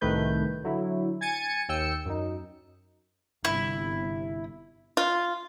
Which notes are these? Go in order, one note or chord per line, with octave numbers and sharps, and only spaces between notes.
C2 A2 D#3 A3 B4 G6
D3 F#3 E4
G#5 G#6 A6 C#7 D#7
D#2 G5 E6 C#7
F#2 D#4
G1 C3 E4
F4